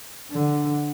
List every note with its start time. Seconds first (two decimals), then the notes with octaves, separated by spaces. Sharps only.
0.31 D3